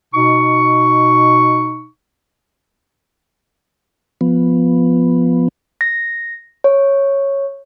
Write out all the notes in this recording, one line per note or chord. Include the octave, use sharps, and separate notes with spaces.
B2 D#4 C#6
F3 B3
A#6
C#5